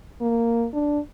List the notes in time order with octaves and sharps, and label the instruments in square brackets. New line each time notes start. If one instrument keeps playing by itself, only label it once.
[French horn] A#3
D4